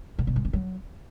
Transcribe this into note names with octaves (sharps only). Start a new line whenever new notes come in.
A#2
B2
G#2
C#3
F#3